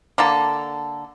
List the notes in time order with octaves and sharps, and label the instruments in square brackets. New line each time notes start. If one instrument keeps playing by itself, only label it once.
[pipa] D3 A#3 A4